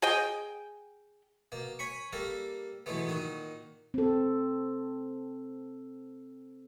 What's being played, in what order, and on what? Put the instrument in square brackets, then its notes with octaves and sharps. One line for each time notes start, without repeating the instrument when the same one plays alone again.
[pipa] G#4 D#5 G5
[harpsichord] B2 A#3
C#5 G#5 B5 C#6
G3 A#3 A4 A#4
B2 E3 F#3 G#3 A3 B3
A#2 D#3 D#4 F#4
[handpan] C4 A4